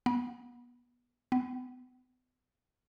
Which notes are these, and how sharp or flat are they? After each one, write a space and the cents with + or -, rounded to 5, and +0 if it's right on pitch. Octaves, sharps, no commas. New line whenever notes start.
B3 -25
B3 +35